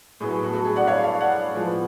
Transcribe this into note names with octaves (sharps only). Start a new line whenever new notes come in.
A2 F#3 B3 G#4
G#4
F#4 A4
F#4 A4
G#4
D5 F#5
C#5 F5
C#5 F5
D5 F#5
A2 F3 G#3 B3